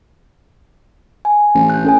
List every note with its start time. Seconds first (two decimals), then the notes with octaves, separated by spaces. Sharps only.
1.25 G#5
1.55 A1
1.70 F#6 G6
1.85 C#4 A4 G#5